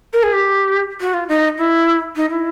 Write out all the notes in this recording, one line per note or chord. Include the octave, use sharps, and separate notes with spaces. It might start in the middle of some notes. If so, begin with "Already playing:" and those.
A#4
G#4
G4
F#4
F4
D#4
E4
D#4
E4